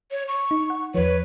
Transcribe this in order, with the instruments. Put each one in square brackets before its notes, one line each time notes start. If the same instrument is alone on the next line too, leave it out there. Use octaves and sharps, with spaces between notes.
[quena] C#5
C#6
[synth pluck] D#4
F#5
[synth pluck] E2 F3 [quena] B4 [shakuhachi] C#5